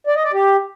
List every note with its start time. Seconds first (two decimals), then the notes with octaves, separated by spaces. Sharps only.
0.07 D5
0.16 D#5
0.24 D5
0.33 G4